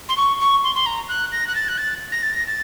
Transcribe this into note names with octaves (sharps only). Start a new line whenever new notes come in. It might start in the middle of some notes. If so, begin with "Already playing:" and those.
C6
C#6
C#6
C6
C6
A#5
F#6
A#6
F#6
A6
F#6
A6
A#6
A6
A#6
A6